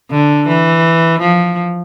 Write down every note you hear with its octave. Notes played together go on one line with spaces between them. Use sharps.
D3
E3
F3